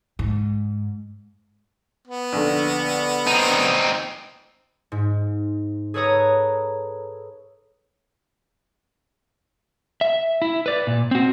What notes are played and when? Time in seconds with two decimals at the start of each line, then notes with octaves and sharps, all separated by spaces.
0.19 G#2
2.08 B3
2.32 A#1 D3
3.27 C4 D#4
4.92 G#2
5.94 G#4 A4 B4 C#5 A#5 D#6
10.01 E5
10.42 E4
10.66 B4 D5
10.87 A#2
11.11 C4 F#4